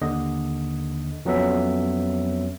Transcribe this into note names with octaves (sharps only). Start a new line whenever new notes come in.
D#2 D3 D#5
F2 F#3 B3 C#4 E5